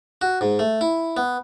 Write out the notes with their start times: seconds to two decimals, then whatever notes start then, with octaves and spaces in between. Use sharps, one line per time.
0.21 F#4
0.41 G#2
0.59 A3
0.81 E4
1.17 B3